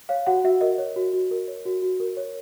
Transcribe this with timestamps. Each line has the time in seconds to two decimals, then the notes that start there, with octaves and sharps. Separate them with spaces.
0.09 C#5 F5
0.27 F#4 F#5
0.44 F#4 E5
0.61 A#4 D#5
0.78 C#5
0.96 F#4
1.13 F#4
1.31 A#4
1.48 C#5
1.65 F#4
1.82 F#4
2.00 A#4
2.17 C#5